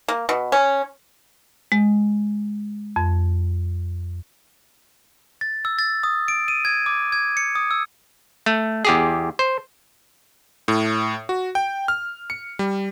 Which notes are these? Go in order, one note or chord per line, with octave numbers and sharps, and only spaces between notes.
A#3
B2
C#4
G#3
F2
A6
E6
A6
D#6
D7
D#7
G#6
D6
G#6
C#7
D#6
E6
A3
E2 G4 G#4
C5
A2
F#4
G5
F6
C#7
G3